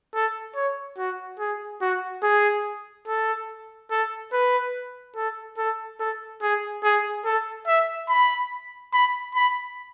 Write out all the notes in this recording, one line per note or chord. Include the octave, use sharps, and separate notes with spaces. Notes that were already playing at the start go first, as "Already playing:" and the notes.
A4
C#5
F#4
G#4
F#4
G#4
A4
A4
B4
A4
A4
A4
G#4
G#4
A4
E5
B5
B5
B5